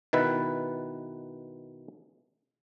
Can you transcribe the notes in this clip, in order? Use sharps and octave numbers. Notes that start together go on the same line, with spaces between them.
B2 D#3 E4 B4